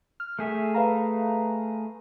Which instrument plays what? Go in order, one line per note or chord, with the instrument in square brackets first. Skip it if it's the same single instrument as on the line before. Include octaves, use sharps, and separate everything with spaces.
[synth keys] F6
[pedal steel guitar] A3 G#4 E5
[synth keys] B4 F5 A#5